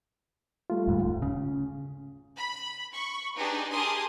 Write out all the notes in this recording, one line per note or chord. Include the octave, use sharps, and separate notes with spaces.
G3 A3 F4
D1 G#2
C#3
B5
B5 C#6
D4 D#4 G4 G#4 B4
G4 G#4 A#4 A5 C6 D#6